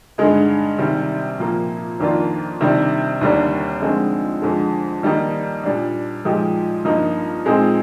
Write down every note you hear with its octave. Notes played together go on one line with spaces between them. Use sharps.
G2 D3 G#3 D#4
C3 D#3 G3
A#2 F3 A#3
F2 D#3 A#3 D4 F4
C3 D#3 G3 D4
D#2 D3 G3 A#3 D4
D3 F3 G#3 C4 D#4
F2 D3 G#3
D#3 G3 A#3 D#4
A#2 G3 D4
A#2 F3 G#3 D#4 G4
G2 F3 A#3 D#4
A#2 G#3 C4 D#4